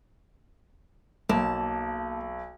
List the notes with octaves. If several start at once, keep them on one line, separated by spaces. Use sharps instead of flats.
B1 A#3 A5